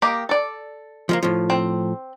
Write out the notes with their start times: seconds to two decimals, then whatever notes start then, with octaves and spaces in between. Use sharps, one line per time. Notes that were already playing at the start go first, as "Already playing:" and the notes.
0.02 A#3 G4 D#5
0.29 A4 D5
1.09 F3 G#3 A#3
1.23 A2 F3
1.50 C4